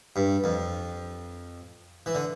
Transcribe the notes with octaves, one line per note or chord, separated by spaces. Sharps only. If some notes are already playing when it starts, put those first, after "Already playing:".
G2
F2
E3
D3